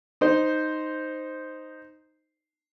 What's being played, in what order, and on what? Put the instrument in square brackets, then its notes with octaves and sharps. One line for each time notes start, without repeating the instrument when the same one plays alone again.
[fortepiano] D#4 C5